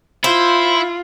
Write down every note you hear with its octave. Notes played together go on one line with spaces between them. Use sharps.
E4 F4 C5